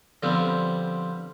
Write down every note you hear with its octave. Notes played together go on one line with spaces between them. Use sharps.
D3 F3 G3 B3 C4